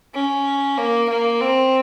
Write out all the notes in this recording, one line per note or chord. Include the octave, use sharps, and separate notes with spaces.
C#4
A#3
A#3
C4